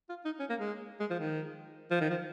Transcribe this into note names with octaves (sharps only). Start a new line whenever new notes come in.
F4
D#4
C#4
A#3
G#3
G#3
F3
D#3
F3
D#3
F3